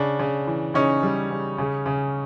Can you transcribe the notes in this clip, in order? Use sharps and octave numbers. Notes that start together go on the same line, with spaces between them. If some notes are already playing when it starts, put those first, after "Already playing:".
Already playing: C#3 D4
C#3
E3
C#3 C#4 D#4
G3
C#3
C#3
C#3